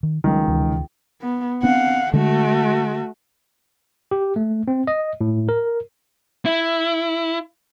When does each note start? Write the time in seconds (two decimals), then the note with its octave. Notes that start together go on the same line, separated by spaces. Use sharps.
0.03 D#3
0.24 C#2 D#3 F#3 G3
0.48 D2 C3 E3
1.22 B3
1.63 B3 C4 D4 F5 F#5
2.13 D3 G#3 A3 F#4
4.11 G4
4.36 A3
4.68 C4
4.87 D#5
5.21 A2
5.49 A#4
6.46 E4